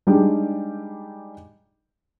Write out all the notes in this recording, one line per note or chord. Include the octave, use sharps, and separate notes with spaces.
G3 G#3 D4 D#4 G4